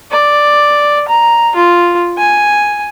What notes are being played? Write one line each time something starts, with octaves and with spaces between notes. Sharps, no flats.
D5
A#5
F4
G#5